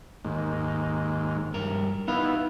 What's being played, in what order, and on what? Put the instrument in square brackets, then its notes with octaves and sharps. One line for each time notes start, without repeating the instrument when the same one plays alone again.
[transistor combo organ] D#2 G#2
[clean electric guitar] G2 A#4
[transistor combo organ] B3 E4 [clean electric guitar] D#4 F5